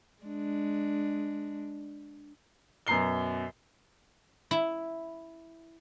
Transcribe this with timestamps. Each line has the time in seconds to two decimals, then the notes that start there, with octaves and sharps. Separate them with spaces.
0.24 G#3 D4
2.87 F#2 B2 A#5 C7 G7
4.51 E4